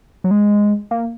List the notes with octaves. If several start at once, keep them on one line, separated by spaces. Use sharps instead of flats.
F#3
G#3
A#3